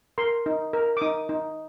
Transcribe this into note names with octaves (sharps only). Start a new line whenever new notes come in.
A#4 C6
D#4
A#4
D6
D#4 D#6
D#4